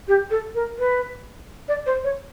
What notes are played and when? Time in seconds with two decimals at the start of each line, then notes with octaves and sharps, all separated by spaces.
0.08 G4
0.31 A4
0.55 A#4
0.79 B4
1.68 D5
1.86 C5
2.04 C#5